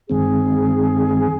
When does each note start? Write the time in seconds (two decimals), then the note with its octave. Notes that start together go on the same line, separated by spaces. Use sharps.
0.09 G2 D#3 G#3 C4 G#4